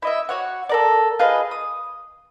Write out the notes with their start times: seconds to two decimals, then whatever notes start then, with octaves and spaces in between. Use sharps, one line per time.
0.02 E4 D#5 E5
0.29 F#4 C#5 F#5
0.69 A4 A#4 D5
1.19 F4 G#4 B4 D#5
1.51 D#6